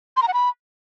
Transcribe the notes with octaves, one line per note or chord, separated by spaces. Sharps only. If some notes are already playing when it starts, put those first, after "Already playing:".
C6
A#5
F#5
B5